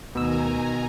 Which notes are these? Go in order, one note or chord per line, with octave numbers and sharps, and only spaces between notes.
D2 B2 D#3 G#5 A#5 E6